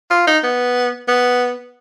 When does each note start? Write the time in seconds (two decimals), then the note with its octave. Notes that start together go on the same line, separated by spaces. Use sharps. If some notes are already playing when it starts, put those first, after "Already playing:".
0.11 F4
0.27 D#4
0.43 B3
1.08 B3